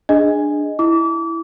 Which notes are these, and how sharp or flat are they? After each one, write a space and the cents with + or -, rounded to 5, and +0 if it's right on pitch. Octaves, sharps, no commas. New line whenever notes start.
D4 +10 G#4 +0 D#5 +0
E4 +0 D6 -30